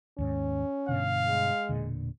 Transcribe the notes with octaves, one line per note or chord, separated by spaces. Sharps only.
D#2 G#2 C#4
G2 B2 D3 F5
G#3
E1 A#2 D3